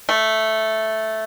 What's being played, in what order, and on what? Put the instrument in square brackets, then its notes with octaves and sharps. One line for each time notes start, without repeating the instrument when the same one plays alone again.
[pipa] A3